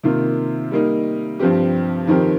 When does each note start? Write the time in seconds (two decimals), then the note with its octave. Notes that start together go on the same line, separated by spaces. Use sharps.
0.03 C3 D#3 A#3 F4
0.71 G3 A#3 D#4
1.39 G2 F3 C4 G4
2.07 F2 D#3 C4 G4 A#4